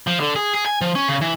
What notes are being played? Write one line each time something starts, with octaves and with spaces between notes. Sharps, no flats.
F3
D3
G#4
G#4
G#5
F3
C#4
C#3
E3